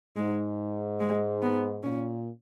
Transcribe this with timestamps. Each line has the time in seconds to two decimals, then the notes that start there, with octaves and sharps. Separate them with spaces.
0.16 G#2 G#3
1.00 G#3
1.42 B3
1.83 A#2 C#4